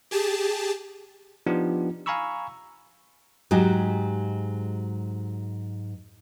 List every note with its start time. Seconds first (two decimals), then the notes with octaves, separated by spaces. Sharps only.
0.11 G4 G#4 A5
1.47 F3 B3 D4 D#4 F4 G4
2.06 F5 G#5 A#5 B5 C#6 E6
3.51 G#2 F#3 G#3 F#4 G4